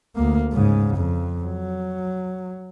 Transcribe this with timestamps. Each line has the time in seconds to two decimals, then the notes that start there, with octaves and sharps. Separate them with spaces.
0.16 D2 A#3
0.53 G#2 C#3
0.97 F2
1.44 F#3